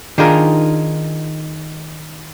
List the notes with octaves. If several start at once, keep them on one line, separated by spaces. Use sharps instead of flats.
D#3 D4 D#4 F4 G#4 A#4